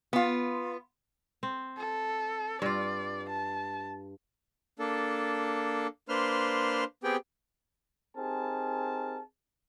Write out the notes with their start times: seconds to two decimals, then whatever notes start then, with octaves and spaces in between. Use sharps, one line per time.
0.13 B3 F4
1.43 C4
1.77 A4
2.62 G2 F4 D5
3.29 A5
4.79 A#3 D4 A4
6.09 A#3 D4 B4 C5 C6 F6
7.04 B3 C4 G4 G#4 G5
8.17 C4 D#4 G4 G#4 A#4 A5